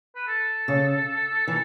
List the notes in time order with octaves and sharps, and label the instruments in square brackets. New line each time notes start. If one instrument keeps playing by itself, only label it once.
[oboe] B4
A4
[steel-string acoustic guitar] C#3
E3